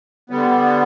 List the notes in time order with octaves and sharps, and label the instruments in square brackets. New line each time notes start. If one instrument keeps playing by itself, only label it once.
[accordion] D3 G3 B3